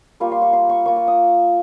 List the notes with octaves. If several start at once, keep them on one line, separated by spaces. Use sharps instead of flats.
G3 A#3 F4 C#6
C6
C#6
C6
C#6
A#3 F4 C#6
C#6
D#6